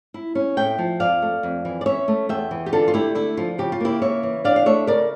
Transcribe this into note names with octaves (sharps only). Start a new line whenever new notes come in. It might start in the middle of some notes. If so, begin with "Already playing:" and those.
E4
C#4
A2 E5 G5
F3
F2 D5 F5
A3
F2
E3
D5
C#4 C#5 E5
A3
E2 E5 G5
E3
G4
D3 F4 A4
F4
A3 E4 G4
D3 E4
F3 F4
C#3 G4
F4
A#3 E4 G4
C#3 C#5 E5
E3
D4 D5 F5
F5
A3 C#5 E5
C#3 A#4 D5